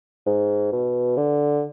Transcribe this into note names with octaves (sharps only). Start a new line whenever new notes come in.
G#2
B2
D3